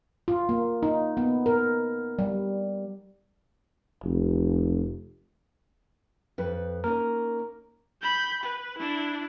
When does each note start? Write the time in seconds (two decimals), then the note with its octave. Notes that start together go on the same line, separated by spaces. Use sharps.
0.28 F4
0.49 A#3
0.83 D#4
1.17 B3
1.46 A#4
2.19 G3
4.04 F1
6.38 F2 B4
6.84 A#3 C#4 D#4 A#4
8.02 B5 G6
8.43 B4
8.78 D4 E4